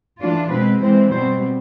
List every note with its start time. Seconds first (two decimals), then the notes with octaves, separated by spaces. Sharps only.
0.20 E3 A3 D4 F4
0.51 B2 G#3 C4 B4
0.81 E3 G#3 C4 C5
1.11 B2 G3 C4 C5